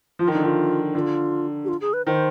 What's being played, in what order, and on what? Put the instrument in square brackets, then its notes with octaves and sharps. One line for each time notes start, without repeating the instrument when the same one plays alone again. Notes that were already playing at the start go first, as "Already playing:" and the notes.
[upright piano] F3 [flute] F4
[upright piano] D#3
[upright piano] D3 [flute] D#4
[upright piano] D#3 [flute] F4
[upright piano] D3 [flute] F4
[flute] G4
F4
G#4
B4
[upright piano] D#3 [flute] C5